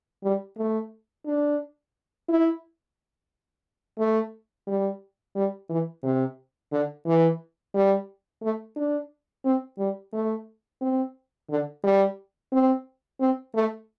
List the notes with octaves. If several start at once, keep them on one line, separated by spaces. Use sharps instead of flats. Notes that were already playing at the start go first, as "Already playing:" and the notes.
G3
A3
D4
E4
A3
G3
G3
E3
C3
D3
E3
G3
A3
D4
C4
G3
A3
C4
D3
G3
C4
C4
A3